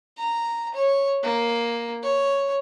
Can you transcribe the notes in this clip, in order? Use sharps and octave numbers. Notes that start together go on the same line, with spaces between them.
A#5
C#5
A#3
C#5